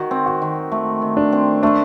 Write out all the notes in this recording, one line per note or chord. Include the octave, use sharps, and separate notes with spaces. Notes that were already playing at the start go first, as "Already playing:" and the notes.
Already playing: D#3 F#4
C4
F#4
D#3
A3
D#3
D4
C4
A3 D4